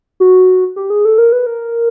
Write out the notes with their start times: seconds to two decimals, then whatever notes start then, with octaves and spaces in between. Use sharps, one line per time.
0.20 F#4
0.76 G4
0.90 G#4
1.05 A4
1.18 A#4
1.32 B4
1.46 A#4